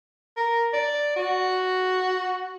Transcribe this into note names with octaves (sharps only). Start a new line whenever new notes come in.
A#4
D5
F#4